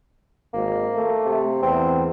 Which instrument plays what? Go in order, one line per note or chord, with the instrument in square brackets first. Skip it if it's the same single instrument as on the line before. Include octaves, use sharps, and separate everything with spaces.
[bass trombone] G#1 [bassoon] A#3
[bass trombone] A3
[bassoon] C3
[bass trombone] E2 [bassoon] C4